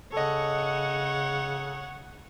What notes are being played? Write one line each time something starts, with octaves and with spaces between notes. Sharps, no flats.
C#3 A4 C#5 D#5 F#5